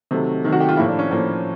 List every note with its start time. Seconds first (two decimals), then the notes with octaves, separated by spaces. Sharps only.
0.11 C3 D#3 F#3 A3
0.44 C3 D#3 F#3 A3
0.52 F#4
0.60 G4
0.69 F4
0.77 A2 F3 A#3 E4
0.88 D4
0.99 C#4
1.10 A2 F3 A#3